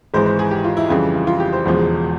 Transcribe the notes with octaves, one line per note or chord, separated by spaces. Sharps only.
G#1 G#2 E3 G#3 C5
C5
G#4
G4
F4
E4
F2 C#3 E3 G3 F4
F4
F4
G4
C5
E1 E2 C#3 F3 G#3